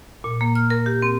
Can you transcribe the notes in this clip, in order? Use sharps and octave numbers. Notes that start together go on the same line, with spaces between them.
A#2
A#3
F6
A#4
G4
C4